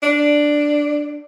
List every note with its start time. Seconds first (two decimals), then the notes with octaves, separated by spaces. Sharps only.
0.03 D4